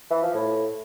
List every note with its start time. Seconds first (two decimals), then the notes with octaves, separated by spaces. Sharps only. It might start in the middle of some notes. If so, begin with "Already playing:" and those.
0.10 E3
0.22 F3
0.34 A2